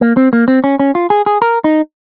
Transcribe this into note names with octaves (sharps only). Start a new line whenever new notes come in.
A#3
C4
A#3
C4
C#4
C#4
F4
G#4
G#4
A#4
D#4